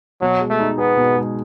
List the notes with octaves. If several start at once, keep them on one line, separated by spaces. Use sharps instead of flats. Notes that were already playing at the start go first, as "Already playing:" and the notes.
B2 F#3
G#3
A3
D#4
B3 G#4
B2
G#3